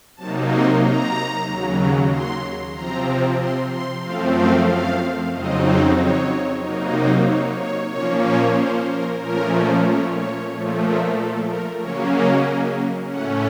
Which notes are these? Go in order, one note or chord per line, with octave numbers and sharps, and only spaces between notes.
C3 F#3 A#3 D#4 A5
C6
A#5
D#2 C#3 F#3
C6
C3 F3 C4 A#5
C6
C6
F#2 F3 A3 C4 F5
F5
F5
F2 C#3 F#3 C4 D#4 D#5
C#5
C3 F#3 A#3 D#4 A#4
C5
C#5
C#5
A#2 F3 A#3 C#4 C#5
C#5
C5
A#4
A#2 F3 A3 C#4 A#4
C#5
C#5
A#2 F3 A3
A#4
A4
A#4
C#3 F#3 A#3 C#4 C#5
D#5
A2 A3 C#4 F#5